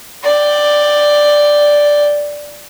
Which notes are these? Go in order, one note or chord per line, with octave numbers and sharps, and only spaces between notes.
D5 G5